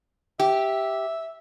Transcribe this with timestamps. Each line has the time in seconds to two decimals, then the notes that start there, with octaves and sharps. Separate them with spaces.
0.40 G4 E5